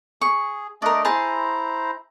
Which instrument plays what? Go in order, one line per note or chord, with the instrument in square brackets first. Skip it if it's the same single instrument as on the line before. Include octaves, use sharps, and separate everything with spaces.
[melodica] G#4 [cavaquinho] C#6
[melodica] A3 D4 D#5 [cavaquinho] A#4 D5
[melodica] E4 C5 A#5 [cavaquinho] G#4 A5 C6